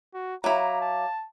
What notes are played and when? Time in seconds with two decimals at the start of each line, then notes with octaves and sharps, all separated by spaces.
0.14 F#4
0.44 F#3 E4 F5 A#5 D6
0.81 A5